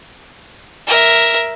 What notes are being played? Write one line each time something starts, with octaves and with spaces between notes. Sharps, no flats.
A#4 E5